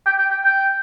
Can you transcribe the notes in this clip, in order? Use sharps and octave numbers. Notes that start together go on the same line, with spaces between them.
G5
G5
G5
G5